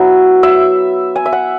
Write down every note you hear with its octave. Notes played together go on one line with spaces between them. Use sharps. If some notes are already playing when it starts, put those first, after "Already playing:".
Already playing: F#3 B3 E4 E5
E5
G#5
E5
F#5